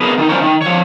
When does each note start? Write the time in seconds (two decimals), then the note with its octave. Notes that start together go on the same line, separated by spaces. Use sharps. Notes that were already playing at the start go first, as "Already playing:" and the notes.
0.01 B3 G#4 A#4
0.18 D#3 A3 D#4
0.29 G3 C#4 F4 A#4 C5 C#5
0.41 D#3
0.62 F3 C#5